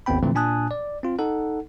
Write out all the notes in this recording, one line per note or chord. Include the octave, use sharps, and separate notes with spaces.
G#1 D#2 B3 C4 G5 B5
A#2 D3 E3 F3 A3 C4
A#2 D4 G#5 A5 D#6 F#6
D5
C4 F4
D#4 A4 F#5